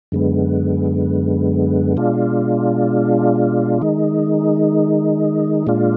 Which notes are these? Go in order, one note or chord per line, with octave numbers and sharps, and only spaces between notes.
F#2 D3 G#3 B3
B2 G#3 D4 F4
D#3 G#3 D#4
A#2 G#3 D4 F4